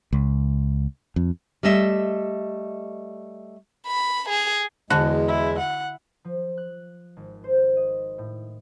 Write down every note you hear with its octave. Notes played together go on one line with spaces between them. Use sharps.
C#2
F2
G3 A3 D#5 E5
B5
G#4
E2 D3 G#3 F#4 A5
E4
F#5
F3
F#6
G#1
C5
D#5
A2